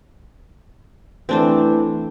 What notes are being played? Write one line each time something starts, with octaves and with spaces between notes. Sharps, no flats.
E3 A3 C4 D4 C5